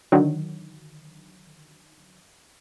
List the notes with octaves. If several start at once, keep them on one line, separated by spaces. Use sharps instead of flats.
D3 D#3 F#3